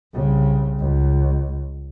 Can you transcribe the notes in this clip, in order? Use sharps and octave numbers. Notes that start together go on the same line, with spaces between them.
C2 C#3
C#2